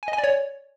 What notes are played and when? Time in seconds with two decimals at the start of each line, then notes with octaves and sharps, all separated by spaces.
0.03 G#5
0.08 D#5
0.13 G#5
0.18 D5
0.24 C#5